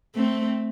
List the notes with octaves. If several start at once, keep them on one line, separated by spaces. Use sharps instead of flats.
A3 C4